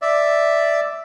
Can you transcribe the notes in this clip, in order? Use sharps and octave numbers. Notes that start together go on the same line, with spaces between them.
D5 E5